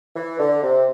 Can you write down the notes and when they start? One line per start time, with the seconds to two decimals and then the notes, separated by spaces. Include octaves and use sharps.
0.15 E3
0.38 D3
0.62 C3